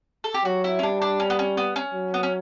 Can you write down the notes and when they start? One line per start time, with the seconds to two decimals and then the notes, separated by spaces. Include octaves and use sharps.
0.24 A4
0.34 G4
0.45 F#3 F#4
0.64 E4
0.79 C#4
0.83 G3 D4
1.02 D4
1.20 C#4
1.30 B3
1.39 C#4
1.57 B3
1.76 C#4
1.94 F#3
2.14 B3
2.23 C#4